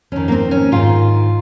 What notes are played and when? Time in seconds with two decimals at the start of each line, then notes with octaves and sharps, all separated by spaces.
0.12 F2 D#3 C#4
0.28 A#3
0.32 C4
0.51 C#4
0.72 G#2 D#3 F4